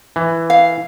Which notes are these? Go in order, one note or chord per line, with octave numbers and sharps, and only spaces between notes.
E3
F5